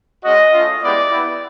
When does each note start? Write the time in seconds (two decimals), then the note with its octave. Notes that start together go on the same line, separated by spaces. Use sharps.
0.24 G#3 C#4 F#4 D#5
0.53 A3 C#4 F4
0.82 G#3 B3 E4 G4 D5
1.10 B3 E4 G4